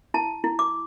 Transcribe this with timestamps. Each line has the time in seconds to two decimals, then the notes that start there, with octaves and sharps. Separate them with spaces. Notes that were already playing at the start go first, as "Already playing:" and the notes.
0.14 E4 A5
0.44 E4
0.59 D6